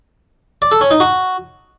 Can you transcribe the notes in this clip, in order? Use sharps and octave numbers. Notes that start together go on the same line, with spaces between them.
D5
A4
C#4
D#4
F#4